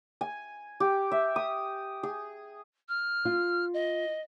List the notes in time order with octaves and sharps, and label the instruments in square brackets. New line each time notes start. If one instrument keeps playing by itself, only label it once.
[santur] G#5
G4
E5
D#6
G#4
[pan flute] F6
[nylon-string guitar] F4
[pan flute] D#5